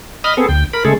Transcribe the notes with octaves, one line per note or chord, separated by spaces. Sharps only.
D#5 B5 D#6 F6
B3 C4 G#4 A4
D2 G5
A#4 B5
C#3 G#3 A3 G#4 A4